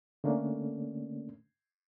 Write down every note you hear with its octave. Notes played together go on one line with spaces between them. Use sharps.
D3 A3 A#3 C#4 D4